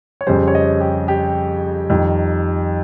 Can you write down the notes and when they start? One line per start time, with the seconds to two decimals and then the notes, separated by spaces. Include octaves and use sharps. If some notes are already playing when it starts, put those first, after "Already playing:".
0.21 C#5
0.27 F2 C#3 G3 C5
0.48 C#5
0.55 D#5
0.81 G4
1.08 G4
1.90 F2 D#3 G3